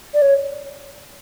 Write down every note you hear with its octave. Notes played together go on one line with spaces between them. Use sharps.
D5
C#5